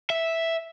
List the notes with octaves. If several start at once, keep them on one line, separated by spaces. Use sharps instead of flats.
E5